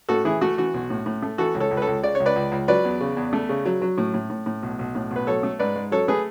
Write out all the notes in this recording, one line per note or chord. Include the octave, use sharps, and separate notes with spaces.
A2 F#4 A4
E3 E4 G#4
A3 F#4
E3 F#4
B1
A2
A2
A3
E3 F#4 A4
C#2
A4 C#5
C#2
B4
A4 C#5
C#2
C#3 D5
C#2 C#5
B4 D5
C#2
C#2
F#3 B4 D5
E2
C#3
E2
A3
C#3
F#3
F#3
A2
A2
A2
A2
B1
B1
A2
B1
B4
F#3 A4 C#5
A3
G#2 B4 D5
G#2
F#3 A4 C#5
A3 G#4 B4